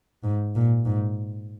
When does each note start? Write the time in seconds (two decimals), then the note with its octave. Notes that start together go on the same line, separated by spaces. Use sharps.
0.23 G#2
0.55 A#2
0.85 G#2